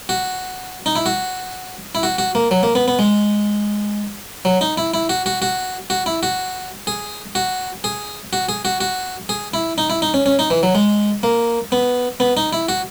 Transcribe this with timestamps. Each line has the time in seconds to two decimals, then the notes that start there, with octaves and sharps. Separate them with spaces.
0.09 F#4
0.86 D#4
0.96 E4
1.06 F#4
1.95 E4
2.03 F#4
2.18 F#4
2.35 A#3
2.51 F#3
2.63 A#3
2.75 B3
2.88 B3
2.99 G#3
4.45 F#3
4.61 D#4
4.77 E4
4.94 E4
5.09 F#4
5.26 F#4
5.42 F#4
5.90 F#4
6.06 E4
6.23 F#4
6.87 G#4
7.35 F#4
7.84 G#4
8.33 F#4
8.49 G#4
8.65 F#4
8.81 F#4
9.29 G#4
9.54 E4
9.78 D#4
9.90 E4
10.02 D#4
10.14 C#4
10.26 C#4
10.39 D#4
10.50 E3
10.63 F#3
10.75 G#3
11.23 A#3
11.72 B3
12.20 B3
12.37 D#4
12.53 E4
12.69 F#4